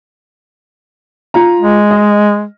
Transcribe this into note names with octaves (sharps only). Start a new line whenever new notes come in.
F4 A#5
G#3
D#5